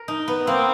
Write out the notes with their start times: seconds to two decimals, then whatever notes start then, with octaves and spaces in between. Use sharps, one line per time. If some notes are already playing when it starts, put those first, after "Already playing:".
Already playing: A#4
0.08 D#4
0.28 B3
0.47 A#3 C4